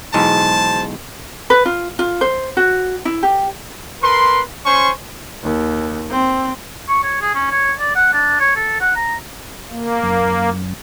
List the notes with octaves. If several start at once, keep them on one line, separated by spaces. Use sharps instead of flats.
B1 E2 G#3 C5 A5
B4
F4
F4
C5
F#4
E4
G4
A#4 B4 C6
C#4 C5 G#5 C6 C#6
D#2
C4
C#6
C#5
G#4
C#4
C#5
D5
F#5
D4
C#5
A4
F#5
A#5
A#3
F#2